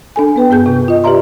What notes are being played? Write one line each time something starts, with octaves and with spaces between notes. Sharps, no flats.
D4 A4 G#5
B3 B4 G5
G2 B3 G#4 G6
C3
F4 D#5
G4 B4 D5 E5 A#5 C6